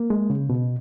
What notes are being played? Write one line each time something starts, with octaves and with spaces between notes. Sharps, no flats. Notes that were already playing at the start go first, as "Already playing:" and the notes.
Already playing: A#3
G#3
C#3
B2